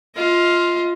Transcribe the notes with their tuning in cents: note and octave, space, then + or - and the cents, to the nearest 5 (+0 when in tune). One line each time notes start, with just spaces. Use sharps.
F4 +0 D#5 +30